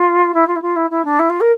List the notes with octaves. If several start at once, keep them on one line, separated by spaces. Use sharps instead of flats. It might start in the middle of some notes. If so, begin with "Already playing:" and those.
Already playing: F4
E4
F4
E4
F4
E4
E4
D4
E4
F4
A#4